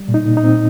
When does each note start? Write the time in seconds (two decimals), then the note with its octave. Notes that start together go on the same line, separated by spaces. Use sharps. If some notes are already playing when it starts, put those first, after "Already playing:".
Already playing: G3
0.08 A#2
0.14 D#4
0.26 A#2
0.37 D#4
0.43 C4